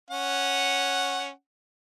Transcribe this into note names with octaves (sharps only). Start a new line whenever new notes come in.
C#4 F#5